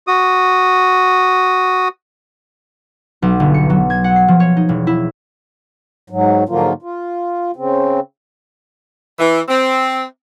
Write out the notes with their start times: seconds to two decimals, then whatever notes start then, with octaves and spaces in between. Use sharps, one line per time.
0.07 F#4 D#6
3.22 B1
3.40 G1
3.54 C#7
3.70 F#3
3.90 G#6
4.04 F#5
4.16 C7
4.28 F3
4.40 C#5
4.57 D#4
4.69 E1
4.87 E4
6.10 G#2 F#3
6.49 G#2 D3 F3 F#3 A#3 F4
6.83 F4
7.56 C#3 C4
9.19 E3
9.48 C4